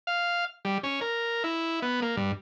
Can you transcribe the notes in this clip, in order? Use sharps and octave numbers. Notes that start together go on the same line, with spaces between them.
F5
G3
C#4
A#4
E4
B3
A#3
G2